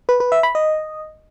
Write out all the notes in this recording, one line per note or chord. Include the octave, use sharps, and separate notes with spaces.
B4
B4
E5
B5
D#5